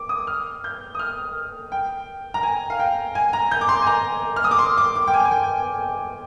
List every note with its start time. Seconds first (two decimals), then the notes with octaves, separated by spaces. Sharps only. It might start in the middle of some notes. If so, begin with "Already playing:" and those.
Already playing: D6
0.09 D#6
0.27 F6
0.64 G6
0.95 D#6
0.99 F6
1.72 G5
2.34 A#5
2.43 G#5
2.70 F5
2.79 G5
3.15 G#5
3.33 A#5
3.51 G6
3.61 D6
3.69 C6
3.82 G#5
3.87 A#5
4.36 F6
4.44 D#6
4.51 D6
4.59 C6
4.78 D6
4.96 D6
5.07 G5
5.14 G#5
5.25 G#5
5.31 G5